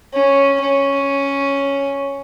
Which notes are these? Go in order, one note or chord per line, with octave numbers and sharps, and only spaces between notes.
C#4
C#4